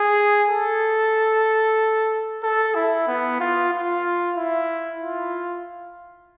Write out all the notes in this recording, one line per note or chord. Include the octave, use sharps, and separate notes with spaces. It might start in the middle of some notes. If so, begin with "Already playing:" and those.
Already playing: G#4
A4
A4
E4
B3
F4
F4
E4
F4